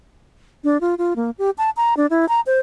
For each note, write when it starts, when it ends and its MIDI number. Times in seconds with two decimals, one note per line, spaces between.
0.64 0.80 62
0.81 0.95 65
0.98 1.14 65
1.16 1.31 58
1.38 1.50 67
1.58 1.70 81
1.77 1.94 82
1.97 2.06 62
2.10 2.28 64
2.29 2.41 82
2.46 2.60 72